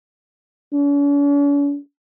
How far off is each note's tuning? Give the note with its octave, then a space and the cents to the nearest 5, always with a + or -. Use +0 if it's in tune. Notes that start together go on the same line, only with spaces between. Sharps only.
C#4 +45